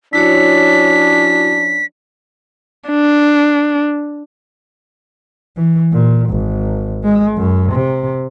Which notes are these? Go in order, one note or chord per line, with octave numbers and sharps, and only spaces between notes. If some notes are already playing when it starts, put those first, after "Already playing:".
F3 C#4 D4 E4 F#4 C#5 B6
D4
E3
A#2
G#1
G#3
F#2
C3